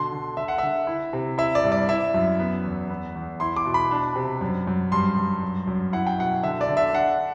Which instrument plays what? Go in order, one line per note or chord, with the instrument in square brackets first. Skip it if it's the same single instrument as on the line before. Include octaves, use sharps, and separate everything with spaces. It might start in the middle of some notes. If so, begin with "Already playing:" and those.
Already playing: [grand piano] B2 D3 C6
D3
D3 E5
F#5
D3 E5
E4
C3
E4 E5
D5
G2
D5
E4 E5
F#2
B3
E2
B3
E2
E4 C6
D6
B2
B5
D4
C3
F#2
F#2
G2 C6
G2
F#2
F#2
E4 F#5
G5
B2 F#5
D3 E5
D5
D3
E5
D4 F#5